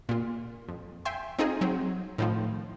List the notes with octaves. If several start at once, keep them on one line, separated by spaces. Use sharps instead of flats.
A#2 F4
F2
E5 G5 G#5 C6
C4 D#4 F4 G#4 D#5
F#3 C4
A2 D#3 F3